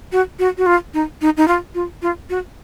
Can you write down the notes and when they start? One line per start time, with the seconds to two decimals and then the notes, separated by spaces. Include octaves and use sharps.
0.12 F#4
0.39 F#4
0.58 F#4
0.66 F4
0.94 D#4
1.21 D#4
1.37 D#4
1.48 F4
1.75 F4
2.02 F4
2.30 F#4